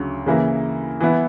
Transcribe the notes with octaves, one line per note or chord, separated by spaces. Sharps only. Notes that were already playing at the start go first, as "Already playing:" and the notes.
Already playing: D2 C#3 F#3
C#3 E3 A#3 E4 A#4
E3 B3 E4